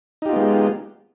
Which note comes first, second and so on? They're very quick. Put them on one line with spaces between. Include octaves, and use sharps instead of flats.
D#4 G4 F4 B3 G#3